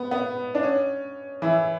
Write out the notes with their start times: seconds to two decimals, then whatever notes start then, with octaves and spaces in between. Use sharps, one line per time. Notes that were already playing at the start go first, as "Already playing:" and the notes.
Already playing: B3
0.11 B3
0.55 D4
0.63 C#4
1.42 E3 E4